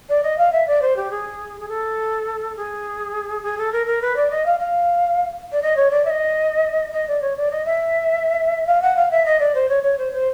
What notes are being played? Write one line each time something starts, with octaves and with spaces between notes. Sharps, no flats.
D5
D#5
F5
E5
D5
C5
G4
G#4
G#4
A4
G#4
G#4
A4
A#4
A#4
B4
D5
D#5
F5
F5
D5
D#5
C#5
D5
E5
D#5
D#5
D5
C#5
D5
D#5
E5
F5
F#5
F5
E5
D#5
D5
C5
C#5
C#5
C5
C5